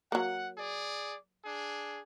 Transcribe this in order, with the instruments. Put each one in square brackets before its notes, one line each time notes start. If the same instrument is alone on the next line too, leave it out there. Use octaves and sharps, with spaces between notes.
[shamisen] F#3 A#3 [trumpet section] F#5
[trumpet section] G#4 D5
D4 G#4